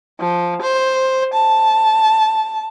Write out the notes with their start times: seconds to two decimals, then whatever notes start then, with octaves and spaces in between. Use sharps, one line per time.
0.20 F3
0.62 C5
1.34 A5